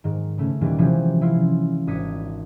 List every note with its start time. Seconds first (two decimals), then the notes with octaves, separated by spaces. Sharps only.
0.04 G#2 D#3
0.38 C#3 A3 C#4
0.61 D#2 A#2 D#3 E3 G3
0.78 C3 E3 F3 G#3 C#4 G4
1.21 C#4 E4 F4 F5 C6
1.87 G#1 D4 D#6 G#6 B6 C#7